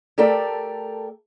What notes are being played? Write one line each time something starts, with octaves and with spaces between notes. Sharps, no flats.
A3 G4 A4 A#4 D5 G5